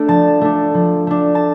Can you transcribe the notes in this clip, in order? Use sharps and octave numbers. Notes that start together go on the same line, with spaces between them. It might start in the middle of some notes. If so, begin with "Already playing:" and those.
Already playing: A3 D4 D5
F3 A5
A3 D4
F3
A3 D4
A5